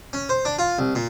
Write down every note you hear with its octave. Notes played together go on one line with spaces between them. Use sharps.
C#4
C5
D4
F4
C2
A#2